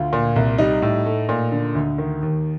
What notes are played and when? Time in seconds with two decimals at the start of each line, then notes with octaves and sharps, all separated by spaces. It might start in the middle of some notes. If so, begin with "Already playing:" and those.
Already playing: D2 F4
0.13 A#2
0.36 C2
0.58 G3 D#4
0.82 A2
1.06 A3
1.29 A#2
1.52 D3
1.75 D2
1.98 D#3
2.22 D#2